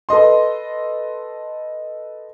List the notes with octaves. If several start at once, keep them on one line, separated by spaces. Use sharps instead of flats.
A4 B4 D#5 C6